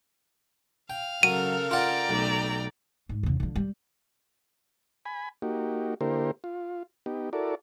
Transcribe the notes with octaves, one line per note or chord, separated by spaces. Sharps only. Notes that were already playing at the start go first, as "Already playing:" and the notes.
F5 G5
C#3 F#3 A4 A#4 D#7
F4 D5 F#5 G5 A#5
B1 A3
G#2
E2 C#3
D3 F3
G3
G#5 B5
A#3 D#4 F#4 G4
D3 A#3 E4 G4 A#4 C5
F4
B3 D#4 G4
E4 F#4 A4 A#4 D5